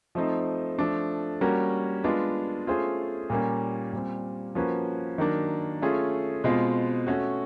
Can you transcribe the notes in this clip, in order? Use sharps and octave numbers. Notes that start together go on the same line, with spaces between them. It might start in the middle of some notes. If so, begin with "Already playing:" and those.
F3 A3 C4 D#4
F3 A3 D4
G3 A#3 C#4 F#4 A#4
G#3 B3 D4 F4
A3 C#4 F4 G#4 C5
A#2 G3 A#3 C#4
A#2 G3 C4
F3 A#3 C#4 F#4 B4
D#3 F#3 A#3 D4
A3 C#4 F4 G#4
B2 G#3 C4 F4
A3 C#4 F#4